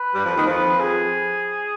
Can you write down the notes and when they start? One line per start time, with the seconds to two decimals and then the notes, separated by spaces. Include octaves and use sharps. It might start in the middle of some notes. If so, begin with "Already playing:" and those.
Already playing: B4
0.15 G2 G3
0.25 F2 F3
0.36 D#2 D#3
0.47 F2 F3 B4
0.80 G#4